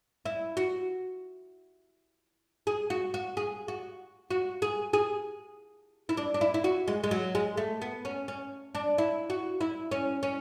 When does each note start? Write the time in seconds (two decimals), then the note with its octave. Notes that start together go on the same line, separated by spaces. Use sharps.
0.25 E4
0.57 F#4
2.67 G#4
2.90 F#4
3.14 F#4
3.37 G#4
3.68 F#4
4.31 F#4
4.62 G#4
4.93 G#4
6.09 E4
6.17 D4
6.34 D4
6.41 E4
6.54 E4
6.64 F#4
6.88 G#3
7.04 G#3
7.11 F#3
7.35 G#3
7.57 A3
7.82 B3
8.05 C#4
8.28 C#4
8.75 D4
8.98 E4
9.30 F#4
9.61 E4
9.92 C#4
10.23 C#4